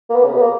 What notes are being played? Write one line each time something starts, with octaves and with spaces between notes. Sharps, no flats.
A#3
B3
C#3
B2
B3
A#3